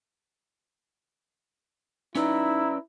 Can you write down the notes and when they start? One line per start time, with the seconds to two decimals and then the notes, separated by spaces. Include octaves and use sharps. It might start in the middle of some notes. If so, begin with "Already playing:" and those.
2.15 C#4 D#4 E4 B4 D5 A#5 E6